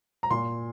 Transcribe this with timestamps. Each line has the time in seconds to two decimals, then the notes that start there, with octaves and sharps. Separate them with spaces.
0.23 A#5
0.31 A#2 C6